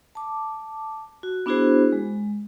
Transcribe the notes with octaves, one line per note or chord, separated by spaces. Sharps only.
A5 D6
F#4
B3 D4 E4 F#4 G#4 C5
G#3